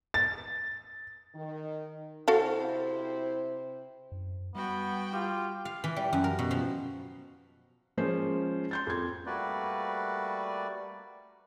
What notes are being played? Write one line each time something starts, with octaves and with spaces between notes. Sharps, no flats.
A6
D#3
C3 E4 F#4 A4 C5 F5
F#2
G3 B3 F#4 G5
F4 G4
F5
E3
G3
F#2
A#4
B2
F3
F3 G#3 A#3 C#4 F4 C5
C6 G6 A6
F2 G#6
G3 A3 A#3 F#4 B4 D5